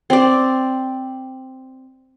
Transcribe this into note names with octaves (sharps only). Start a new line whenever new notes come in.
C4 D5